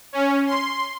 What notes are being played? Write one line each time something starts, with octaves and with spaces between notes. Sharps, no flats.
C#4
C6